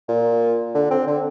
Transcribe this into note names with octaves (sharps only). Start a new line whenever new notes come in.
A#2
D3
C4
D3